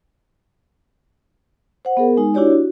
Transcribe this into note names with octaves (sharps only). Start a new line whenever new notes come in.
C5 F#5
B3 G#4 A#4
G#3 D#4 G#5
D4 E4 F#4 G4 C#5 D5
F#4